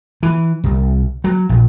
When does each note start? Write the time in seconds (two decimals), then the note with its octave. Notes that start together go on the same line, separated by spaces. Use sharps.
0.23 E3
0.64 C2
1.24 F#3
1.49 A#1